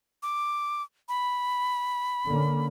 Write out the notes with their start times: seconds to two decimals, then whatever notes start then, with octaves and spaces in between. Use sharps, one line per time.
0.23 D6
1.09 B5
2.25 D3 A#3 C#4